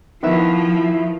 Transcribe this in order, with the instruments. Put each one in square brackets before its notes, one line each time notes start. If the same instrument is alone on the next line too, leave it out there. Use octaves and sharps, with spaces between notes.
[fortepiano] D#3 B3 E5 [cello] F3 [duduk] E4